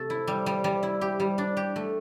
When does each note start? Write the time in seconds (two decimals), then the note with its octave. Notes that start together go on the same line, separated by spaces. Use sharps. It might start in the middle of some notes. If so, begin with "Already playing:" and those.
Already playing: C3 A3 A4
0.10 E4
0.28 G3
0.46 G3
0.64 G3
0.83 E4
1.01 G4
1.20 G3
1.38 D4
1.57 G4
1.76 A3